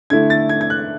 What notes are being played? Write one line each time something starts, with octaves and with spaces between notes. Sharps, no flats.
D3 A3 E4 G#6
A6
G#6
G#6
F#6